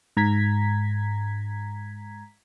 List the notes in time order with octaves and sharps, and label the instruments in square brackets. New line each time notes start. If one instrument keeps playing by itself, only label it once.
[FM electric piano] G#2 A#5 G#6 B6